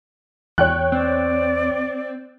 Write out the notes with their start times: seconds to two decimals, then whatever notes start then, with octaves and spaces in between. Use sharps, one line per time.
0.58 E2 C#5 G5 F#6
0.92 C4 D5